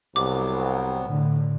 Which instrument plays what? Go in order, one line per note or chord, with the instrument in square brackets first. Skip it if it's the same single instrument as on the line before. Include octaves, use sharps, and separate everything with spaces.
[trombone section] C2 [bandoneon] C3 F#3 B3 [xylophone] D6
[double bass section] A2 D3